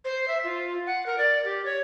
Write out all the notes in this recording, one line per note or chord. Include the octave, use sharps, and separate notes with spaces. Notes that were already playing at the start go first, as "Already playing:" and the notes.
C5
E5
F4
F#5
A#4
D5
G4
C#5